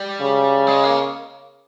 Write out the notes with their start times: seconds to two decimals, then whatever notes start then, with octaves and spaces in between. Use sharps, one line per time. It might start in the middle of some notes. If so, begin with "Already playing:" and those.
Already playing: G3
0.21 C#3
0.67 G#3
0.83 A#3